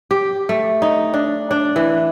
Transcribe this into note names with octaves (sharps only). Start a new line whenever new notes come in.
G4
A3
D#4
D4
D4
E3